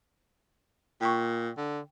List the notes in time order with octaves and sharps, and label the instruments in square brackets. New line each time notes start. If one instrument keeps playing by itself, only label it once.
[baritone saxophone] A#2 [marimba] G5 C#6
[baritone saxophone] D3